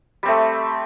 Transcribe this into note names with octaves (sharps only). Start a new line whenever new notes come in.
G3 A3 C4